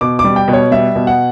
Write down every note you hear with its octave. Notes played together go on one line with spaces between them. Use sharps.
B2 D6
D6
G3
G5
B2
C#5
G3 E5
B2
F#5